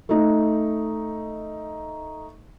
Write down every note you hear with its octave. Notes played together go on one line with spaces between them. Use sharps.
A3 D#4